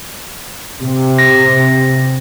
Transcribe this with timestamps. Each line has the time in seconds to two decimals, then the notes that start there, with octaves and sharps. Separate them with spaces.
0.82 C3
1.19 A#6